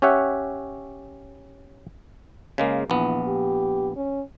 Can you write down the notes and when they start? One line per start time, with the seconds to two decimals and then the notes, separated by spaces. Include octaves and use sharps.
0.02 C#4 G4 C#5 E5 F#5
2.58 C#3 G#3 A#3
2.90 A#1 E3 B3
3.28 G4
3.96 C#4